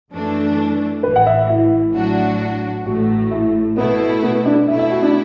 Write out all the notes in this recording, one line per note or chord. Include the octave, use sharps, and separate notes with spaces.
F#2 E3 A3 D4
A1 A2 E3 B4
F#5
E5
E4
A2 F#3 D4 F#4
A1 A2 A3 F#4
E4
B2 A3 B3 E4
B3
D4
B2 A3 E4 E5
E5
F#4
D4